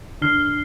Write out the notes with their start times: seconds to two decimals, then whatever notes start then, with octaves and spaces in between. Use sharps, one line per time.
0.22 D3 D4 F6 C7 G7